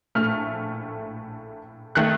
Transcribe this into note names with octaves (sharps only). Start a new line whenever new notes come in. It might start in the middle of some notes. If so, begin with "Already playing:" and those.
A#1 A2 A3 F6
D#3 A3 F#6